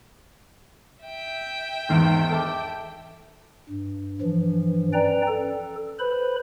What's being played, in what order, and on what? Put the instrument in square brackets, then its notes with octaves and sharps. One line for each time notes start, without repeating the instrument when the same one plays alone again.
[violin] E5 G5
[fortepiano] E2 G#2 D#3
A4 A5 D6
[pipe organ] G2
G2 E3 F3
C#4 B4 D5 G5 A#5
A4
B4 C5 B5